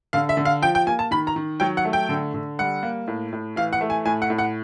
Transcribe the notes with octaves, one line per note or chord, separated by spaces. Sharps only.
D3 F5
E5
D3
F5
F3 G5
G5
A#3 G#5
A5
D#3 B5
A#5
D#3
F#3 G5
F#5
A3
G5
D3
D3
G3 F#5
A#3
A2
A2
E3 F5
F#5
A3
G#5
A2 G#5
F#5
A2
F#5